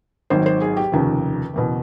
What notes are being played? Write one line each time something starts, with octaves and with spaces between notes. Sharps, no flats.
G#1 G#2 D#3 F#3 C5
C5
G#4
G4
F1 D#2 C#3 F3
F#1 E2 B2